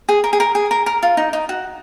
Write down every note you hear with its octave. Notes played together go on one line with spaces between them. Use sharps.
G#4
A#4
G#4
A#4
G#4
A#4
A#4
F4
D#4
D#4
F#4